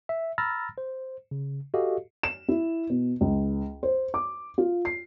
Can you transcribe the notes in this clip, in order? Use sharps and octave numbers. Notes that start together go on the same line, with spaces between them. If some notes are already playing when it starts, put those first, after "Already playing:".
E5
A#5 B5 E6 F6 A6 A#6
C5
C#3
F#4 G4 A4 D#5 F5
E7
E4
B2
C#2
C5
D6
F4
C7